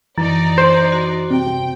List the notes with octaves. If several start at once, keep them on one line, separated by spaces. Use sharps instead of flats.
F#2 E3 D#4 D5
C5
F#4
C3 G5